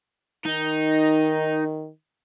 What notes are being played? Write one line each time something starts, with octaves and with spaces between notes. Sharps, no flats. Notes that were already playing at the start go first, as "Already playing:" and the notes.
D#3 D#4